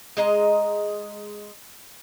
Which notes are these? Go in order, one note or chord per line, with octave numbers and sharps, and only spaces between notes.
G#3 D#5 A#5